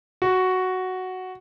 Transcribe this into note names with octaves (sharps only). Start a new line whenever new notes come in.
F#4